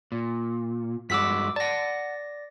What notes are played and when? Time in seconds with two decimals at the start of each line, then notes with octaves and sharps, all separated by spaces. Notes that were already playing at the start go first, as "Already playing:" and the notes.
0.12 A#2
1.10 G2 G#3 F#4 D6 E6 B6
1.56 D5 F#5 A5 A#6